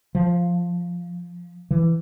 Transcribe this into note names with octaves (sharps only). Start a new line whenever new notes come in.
F3
E3